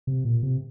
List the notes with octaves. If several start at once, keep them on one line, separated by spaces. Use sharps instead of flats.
C3
A#2
C3